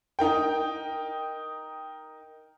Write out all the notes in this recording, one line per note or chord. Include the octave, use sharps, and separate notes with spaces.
D#4 A#4 G5